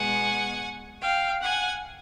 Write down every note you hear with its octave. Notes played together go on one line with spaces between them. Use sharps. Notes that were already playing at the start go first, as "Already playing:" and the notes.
Already playing: B2 G#3 B3 F#5 G#5
F5 G5
F#5 G#5